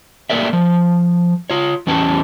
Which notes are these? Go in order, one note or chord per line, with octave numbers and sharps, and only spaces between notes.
A3 A#3 A#4 D5 E5
F3
F4 C#5
E2 E3 C#4 B4 A5